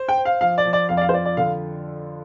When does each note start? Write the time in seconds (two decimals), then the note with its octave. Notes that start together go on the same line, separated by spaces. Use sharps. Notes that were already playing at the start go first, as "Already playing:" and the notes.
Already playing: C5
0.08 G5
0.17 C5
0.25 F5
0.41 F3 F5
0.58 D5
0.65 F3
0.73 D5
0.89 F2 F5
0.97 D5
1.01 F5
1.09 C5
1.13 F4 D5
1.25 D5
1.37 D3 F5